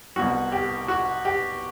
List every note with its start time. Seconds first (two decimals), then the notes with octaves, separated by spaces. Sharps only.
0.16 C2 B2 G3 F#4
0.52 G4
0.88 F#4
1.25 G4